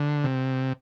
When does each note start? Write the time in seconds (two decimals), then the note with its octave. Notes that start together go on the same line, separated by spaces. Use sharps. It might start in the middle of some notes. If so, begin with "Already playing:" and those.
Already playing: D3
0.24 C3